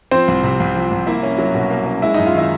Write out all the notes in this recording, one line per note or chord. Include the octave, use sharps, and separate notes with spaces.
F3 C4 C5
C2
C3
C2
F3
C2
A#3 E4 E5
C#4
F#3
B2
A#3
C#4
G#3 E4 E5
F#2 D#4 D#5
F4 F5
D#3 E4 E5